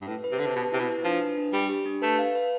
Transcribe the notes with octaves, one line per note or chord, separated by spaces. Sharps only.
G2
A2 B4
B4
C3
D3 A5
C3
B2 B4
C3 E4
B2
B4
F3 D4
B4
D4
G3 G4
G4
D4
A3 B4
F5
B4